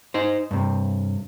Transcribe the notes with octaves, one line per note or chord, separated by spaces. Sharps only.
D#4 C5
G2 C3